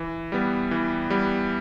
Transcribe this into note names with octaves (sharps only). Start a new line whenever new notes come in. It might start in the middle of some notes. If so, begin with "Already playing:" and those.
Already playing: E3
G3 B3
E3
G3 B3